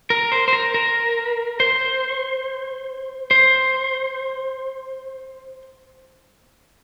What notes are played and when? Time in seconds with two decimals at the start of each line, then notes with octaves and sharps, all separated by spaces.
0.10 A#4
0.32 C5
0.48 C5
0.53 A#4
0.74 A#4
1.60 C5
3.31 C5